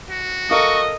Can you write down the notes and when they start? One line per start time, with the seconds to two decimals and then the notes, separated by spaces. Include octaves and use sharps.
0.10 F#4
0.51 A4 A#4 D#5 F5 C#6